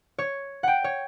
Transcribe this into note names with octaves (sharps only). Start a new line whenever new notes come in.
C#5
F#5 G5
C#5